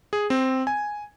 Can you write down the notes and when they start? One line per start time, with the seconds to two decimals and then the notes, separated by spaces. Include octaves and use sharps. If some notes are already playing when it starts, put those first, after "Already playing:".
0.13 G#4
0.30 C4
0.67 G#5